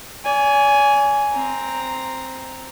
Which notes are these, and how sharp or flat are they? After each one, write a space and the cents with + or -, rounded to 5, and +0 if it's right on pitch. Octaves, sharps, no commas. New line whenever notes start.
D5 -45 G#5 +5
C4 +0 A#5 +0